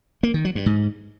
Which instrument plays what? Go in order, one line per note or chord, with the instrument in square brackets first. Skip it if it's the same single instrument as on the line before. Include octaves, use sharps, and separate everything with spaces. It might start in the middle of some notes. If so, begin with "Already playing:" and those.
[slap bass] A#3
D#3
F#3
G2
G#2